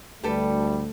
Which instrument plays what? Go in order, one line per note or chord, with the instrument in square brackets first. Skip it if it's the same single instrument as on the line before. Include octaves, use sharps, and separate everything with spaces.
[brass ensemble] D2 [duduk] G3 [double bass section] A3 [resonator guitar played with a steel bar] G4 A4 B4